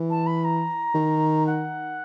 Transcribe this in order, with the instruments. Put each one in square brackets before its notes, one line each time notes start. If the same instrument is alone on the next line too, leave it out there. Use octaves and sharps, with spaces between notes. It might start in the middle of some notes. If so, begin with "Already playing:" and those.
Already playing: [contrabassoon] E3
[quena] A5
B5
A#5
[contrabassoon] D#3
[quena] F#5